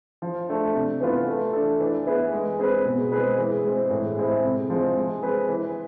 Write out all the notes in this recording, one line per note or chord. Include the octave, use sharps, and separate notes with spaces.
F3
A3 D4
C3
E3 B3 F4
A3
D4 A4
E3
B3 E4 G#4 B4
G#3
C4 G#4 B4
B2
G#3 C4 G#4 B4
E3
G#3 C4
A2
G#3 C4 E4
C3
F3 G#3 C4
G#3
C4 G#4 B4
E3